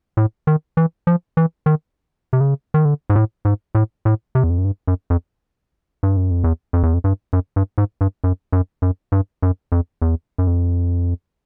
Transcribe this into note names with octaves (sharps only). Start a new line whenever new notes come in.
A2
D#3
E3
F3
E3
D#3
C3
C#3
D#3
D3
G#2
A2
G#2
A2
A2
C3
E2
F2
F#2
G2
F#2
F2
G2
F#2
F2
E2
F2
E2
F2
G2
F#2
G2
G#2
G2
F#2
F#2
F#2
G2
F#2
F2
E2
F#2
F2